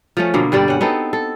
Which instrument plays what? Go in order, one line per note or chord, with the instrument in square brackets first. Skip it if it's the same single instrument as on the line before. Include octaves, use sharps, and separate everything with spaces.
[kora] F3 A3 C#4
B2 D3 A#3
G2 D3 G3 D5
C#4 F#5
B3 C4 D#4 A4
A4